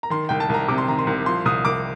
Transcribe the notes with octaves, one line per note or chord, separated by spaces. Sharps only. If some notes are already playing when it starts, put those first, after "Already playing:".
A#5
D#3 C6
C2 G5
A5
C2 A#5
C3 D6
C6
D#3 A#5
C6
C2
F3 C6
C2 D#6
C2 D6